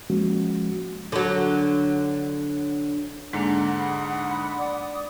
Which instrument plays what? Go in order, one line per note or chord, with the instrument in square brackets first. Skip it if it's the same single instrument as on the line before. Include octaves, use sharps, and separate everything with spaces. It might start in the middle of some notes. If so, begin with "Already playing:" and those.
[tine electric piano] F3 G#3 A#3 C#4 F#4
[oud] D3 F#3
[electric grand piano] G#2 D3 [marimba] G#3 A#3 D4 [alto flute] F#5
[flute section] B5 D#6
D5 D6 D#6